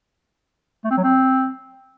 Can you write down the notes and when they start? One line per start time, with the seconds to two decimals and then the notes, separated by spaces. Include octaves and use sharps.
0.84 A3
0.91 C4
0.97 F#3
1.04 C4